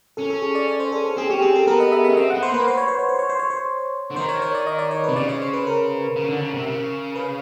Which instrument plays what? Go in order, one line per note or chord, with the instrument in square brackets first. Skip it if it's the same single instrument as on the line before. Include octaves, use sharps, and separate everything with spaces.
[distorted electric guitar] C#4 [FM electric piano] A4
[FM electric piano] A4
G#4
D5
D5
C5
A4
A4
[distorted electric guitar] C4 [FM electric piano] G#4
[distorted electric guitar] C#4 [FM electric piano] G4
[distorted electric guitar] C4 [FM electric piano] G#4
[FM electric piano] A4
[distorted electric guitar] B3 [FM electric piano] A#4
[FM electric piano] D#5
E5
E5
[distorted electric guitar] C#4
[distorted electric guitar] C4 [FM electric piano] D#5
[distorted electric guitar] B3 [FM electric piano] F#5
[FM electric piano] C5
[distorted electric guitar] A#3 [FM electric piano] B4
[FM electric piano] C5
C#5
C5
C#5
C5
C#5
C5
C#5
C5
[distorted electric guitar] D3
[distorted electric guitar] D#3 [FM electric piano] C5
[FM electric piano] C#5
C#5
D5
D#5
D5
C#5
B4
[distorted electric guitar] C3
[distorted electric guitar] C#3 [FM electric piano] D5
[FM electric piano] C#5
C5
B4
A#4
[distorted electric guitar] C#3
D3
C#3
C3
C#3
[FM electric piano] B4